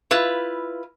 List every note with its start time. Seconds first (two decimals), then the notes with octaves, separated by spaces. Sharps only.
0.11 E4 F4 B4